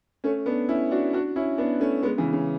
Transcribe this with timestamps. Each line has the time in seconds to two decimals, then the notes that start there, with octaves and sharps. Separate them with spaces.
0.24 A3 C#4
0.46 B3 D4
0.69 C#4 E4
0.91 D4 F#4
1.13 D4 F#4
1.36 C#4 E4
1.58 B3 D4
1.80 A3 C#4
2.03 G#3 B3
2.18 C#3 E3
2.33 C#3